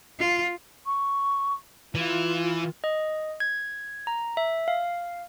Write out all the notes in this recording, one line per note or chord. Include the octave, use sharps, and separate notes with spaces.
F4
C#6
E3 F4
D#5
G#6
A#5
E5
F5